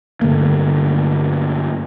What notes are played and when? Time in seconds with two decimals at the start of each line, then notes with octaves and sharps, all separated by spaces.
0.22 G2 D3 A3 A#3